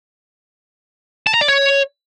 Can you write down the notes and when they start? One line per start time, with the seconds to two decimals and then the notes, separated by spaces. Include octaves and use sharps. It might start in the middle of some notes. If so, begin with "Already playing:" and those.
1.27 A5
1.34 A#5
1.41 D5
1.48 C#5